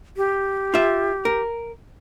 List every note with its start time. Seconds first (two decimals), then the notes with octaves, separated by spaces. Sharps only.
0.17 G4
0.74 F4 E5
1.25 A#4